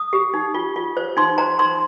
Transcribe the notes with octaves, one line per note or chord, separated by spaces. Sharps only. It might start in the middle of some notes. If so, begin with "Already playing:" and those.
Already playing: D#6
G4
D#4
F4
F4
C5
D#4 C6
C5 A#5
D#4 C6